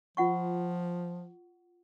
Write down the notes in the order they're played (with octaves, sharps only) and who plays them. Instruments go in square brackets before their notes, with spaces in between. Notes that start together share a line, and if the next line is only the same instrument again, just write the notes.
[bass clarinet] F3 [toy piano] F4 F#5 C#6